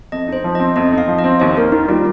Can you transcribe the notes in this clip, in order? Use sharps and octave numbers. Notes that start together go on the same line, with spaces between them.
F2 D#5
D#4 C5
F3
C4 D#5
F2 D#5
D#4
F5
F3
D#5
C4
D#2 C5
A#3 A#4
D#3 D#4
G3 F4